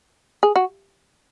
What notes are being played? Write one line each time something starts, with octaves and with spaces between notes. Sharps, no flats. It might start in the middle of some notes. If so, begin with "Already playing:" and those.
G#4
F#4